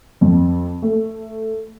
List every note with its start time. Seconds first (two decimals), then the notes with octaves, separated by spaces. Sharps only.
0.21 F2
0.82 A3